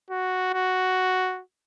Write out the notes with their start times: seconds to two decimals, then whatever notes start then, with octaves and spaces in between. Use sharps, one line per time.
0.10 F#4
0.53 F#4